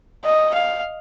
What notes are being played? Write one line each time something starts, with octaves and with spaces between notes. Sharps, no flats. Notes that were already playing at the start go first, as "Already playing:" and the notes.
D#5
F5